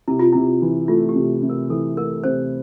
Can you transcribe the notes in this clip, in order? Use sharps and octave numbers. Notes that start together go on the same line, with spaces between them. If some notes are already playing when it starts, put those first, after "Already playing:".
C3 E4
F4
C3 E4
E3
A3 F4
G4
C3
C3
A#4
E3 A4
A3 A#4
C3 C5